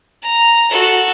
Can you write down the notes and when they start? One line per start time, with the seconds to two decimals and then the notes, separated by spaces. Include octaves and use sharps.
0.23 A#5
0.71 F#4 A4